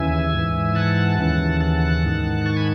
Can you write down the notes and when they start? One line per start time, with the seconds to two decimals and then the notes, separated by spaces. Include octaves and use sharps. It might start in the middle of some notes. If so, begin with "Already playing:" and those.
Already playing: D#2 C#3 E3 E5 G#5
0.33 G#2 E3
0.75 F#5 A5
1.18 D#2 C#3 E3
1.60 F#5 A5
2.03 G#2 D#3
2.46 A5 C#6
2.57 G#5 B5